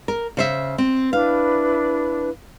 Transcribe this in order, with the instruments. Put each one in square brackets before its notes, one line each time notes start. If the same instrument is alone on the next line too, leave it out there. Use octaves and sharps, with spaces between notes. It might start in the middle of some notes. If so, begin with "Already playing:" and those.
[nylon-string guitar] A#4
C#3 C5 E5
C4
[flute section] D4 E4 B4 [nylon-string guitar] F5